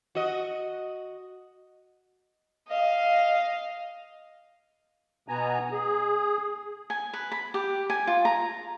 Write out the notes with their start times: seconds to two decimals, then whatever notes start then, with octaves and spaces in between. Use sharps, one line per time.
0.15 F#4 D#5
2.68 D#5 F5
5.28 B2 B3 G#5 A#5
5.72 G#4
6.90 G#5
7.13 B4
7.32 B5
7.54 G4
7.90 G#5
8.07 F4
8.25 A#5